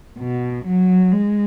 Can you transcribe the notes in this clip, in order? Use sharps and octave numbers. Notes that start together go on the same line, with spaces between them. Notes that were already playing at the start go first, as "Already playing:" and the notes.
B2
F#3
G#3